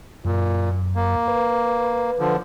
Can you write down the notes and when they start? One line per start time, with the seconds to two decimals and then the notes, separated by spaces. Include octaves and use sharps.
0.25 F#2 A#2
0.95 A#3
1.28 B4
2.19 D3 F3